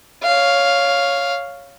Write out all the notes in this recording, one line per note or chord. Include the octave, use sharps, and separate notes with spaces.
C#5 F5